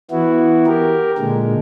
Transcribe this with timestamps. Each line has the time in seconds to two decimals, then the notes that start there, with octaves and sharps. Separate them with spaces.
0.11 E3 B3 E4 F#4
0.66 G4 A#4
1.18 A#2 D3 G#3